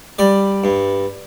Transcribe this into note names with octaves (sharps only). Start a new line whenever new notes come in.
G3 D5
G2